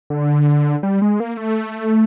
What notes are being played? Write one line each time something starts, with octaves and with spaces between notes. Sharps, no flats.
D3
G3
G#3
A#3
A3